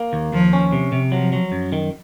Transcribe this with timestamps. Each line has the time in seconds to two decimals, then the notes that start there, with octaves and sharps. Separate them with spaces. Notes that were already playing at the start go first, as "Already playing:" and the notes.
Already playing: A#3
0.13 D#2
0.33 D#2 F3
0.53 C#4
0.73 C3
0.92 C3
1.12 F3 F#3
1.33 F#3
1.52 F#2
1.72 D#3